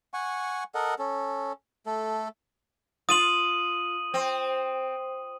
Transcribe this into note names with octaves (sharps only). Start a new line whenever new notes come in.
F#5 G#5 C#6
A4 A#4 D#5 F#5
C#4 A4
A3 A4
F4 D#6 D#7 F#7
C4